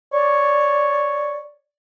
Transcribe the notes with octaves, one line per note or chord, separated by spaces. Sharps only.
C#5 D5